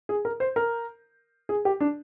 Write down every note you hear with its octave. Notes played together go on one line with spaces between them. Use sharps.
G#4
A#4
C5
A#4
G#4
G4
D4